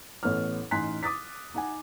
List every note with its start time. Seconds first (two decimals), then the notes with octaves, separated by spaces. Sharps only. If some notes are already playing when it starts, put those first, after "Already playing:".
0.23 A1 B3 A4 C#5 F6
0.71 A1 D#4 G#5 C6 F#6 B6
1.03 D6 D#6 A6 B6
1.54 D#4 F#5 G#5